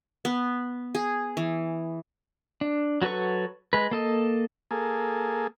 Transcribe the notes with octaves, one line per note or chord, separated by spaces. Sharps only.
B3
G#4
E3
D4
F#3 F#4 A4 B4 C#6
G#3 B4
A#3 A4 D#5
A#3 G#4 A4